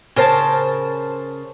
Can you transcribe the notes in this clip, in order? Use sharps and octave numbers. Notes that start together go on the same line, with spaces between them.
C#3 A#4 C5 A5